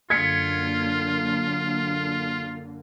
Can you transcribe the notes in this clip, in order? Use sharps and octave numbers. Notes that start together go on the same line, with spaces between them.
F#2 D3 A#3 F4 G#6 B6 C#7